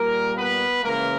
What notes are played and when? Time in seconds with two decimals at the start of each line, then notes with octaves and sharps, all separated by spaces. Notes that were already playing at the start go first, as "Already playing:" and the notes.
Already playing: A#2 G3 A#3 A#4
0.36 B3 B4
0.82 C#3 E3 G#3 A#3 A#4